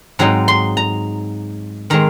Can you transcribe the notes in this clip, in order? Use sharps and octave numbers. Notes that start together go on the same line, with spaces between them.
G#2 F#3 C4 D#4 A#5
C6
A#5
D#3 G#3 C4 A#5